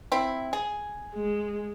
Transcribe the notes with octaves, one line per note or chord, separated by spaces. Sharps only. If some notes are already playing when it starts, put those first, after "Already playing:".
C4 E4
G#4
G#3